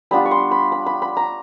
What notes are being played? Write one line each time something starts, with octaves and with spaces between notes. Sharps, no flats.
G3 B3 D4 F4 B5
C#6
C6
B5
B5
B5
B5
A#5